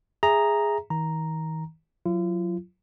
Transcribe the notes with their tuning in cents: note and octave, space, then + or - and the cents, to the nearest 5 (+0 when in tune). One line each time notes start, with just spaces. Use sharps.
G#4 -5 E5 +0 A#5 +0
D#3 +45 A#5 +0
F#3 -25 F4 -40